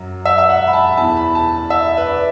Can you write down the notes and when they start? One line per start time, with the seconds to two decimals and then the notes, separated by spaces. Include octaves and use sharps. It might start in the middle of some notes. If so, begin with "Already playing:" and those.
Already playing: F#2 F#3
0.26 E5
0.38 E5
0.49 F#5
0.67 B5
0.73 A5
0.97 E2 E3 A5
1.17 B5
1.35 A5
1.70 E5
1.97 B4
2.07 D5